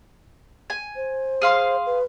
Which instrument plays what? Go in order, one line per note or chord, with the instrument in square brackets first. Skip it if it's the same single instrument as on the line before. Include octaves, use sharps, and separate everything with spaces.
[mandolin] G#5
[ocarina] C5
[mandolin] G#4 F5 C6
[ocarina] B4